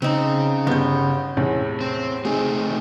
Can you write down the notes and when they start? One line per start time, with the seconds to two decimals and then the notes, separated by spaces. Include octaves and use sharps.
0.02 C#3 C4 C#4 D#4
0.67 G1 B3 G6
1.37 E2 A2 C3
1.81 C4
2.25 A3 C4 D#4 G#4